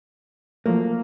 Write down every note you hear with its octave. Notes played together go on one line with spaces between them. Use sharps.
F3 F#3 A3 A#3